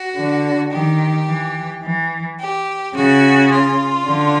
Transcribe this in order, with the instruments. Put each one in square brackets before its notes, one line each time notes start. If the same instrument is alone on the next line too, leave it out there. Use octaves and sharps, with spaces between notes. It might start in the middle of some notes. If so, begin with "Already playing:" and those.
Already playing: [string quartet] F#4
[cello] D3
[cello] D#3 [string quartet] G4
[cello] E3
E3
[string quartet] G4
[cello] C#3 [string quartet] F#4
[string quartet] F4
[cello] D3